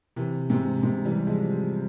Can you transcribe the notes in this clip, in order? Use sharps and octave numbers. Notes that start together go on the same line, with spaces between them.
C3 E3
G#2 C3
G#2 C3
E3 G3
F3 G#3